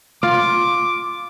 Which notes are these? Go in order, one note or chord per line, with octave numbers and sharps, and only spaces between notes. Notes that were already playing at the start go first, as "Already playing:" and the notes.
F4 D6